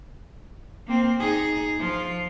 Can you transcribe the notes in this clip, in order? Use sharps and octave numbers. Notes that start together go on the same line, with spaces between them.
A#3 C4
D#4 G#4
F3 F4